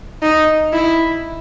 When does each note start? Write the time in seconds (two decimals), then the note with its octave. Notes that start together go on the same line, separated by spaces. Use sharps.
0.22 D#4
0.73 E4